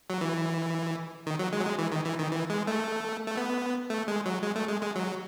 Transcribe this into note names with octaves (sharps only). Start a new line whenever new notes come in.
F#3
E3
D#3
F#3
G#3
F#3
G#3
E3
D#3
E3
D#3
E3
G#3
A3
A3
B3
A3
G#3
F#3
G#3
A3
G#3
G#3
F#3